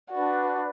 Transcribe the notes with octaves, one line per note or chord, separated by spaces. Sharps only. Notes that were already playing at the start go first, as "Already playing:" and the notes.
D4 F#4 B4 D5